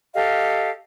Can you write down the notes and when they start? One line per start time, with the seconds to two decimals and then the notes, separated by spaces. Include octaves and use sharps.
0.14 G4 A4 D#5 F5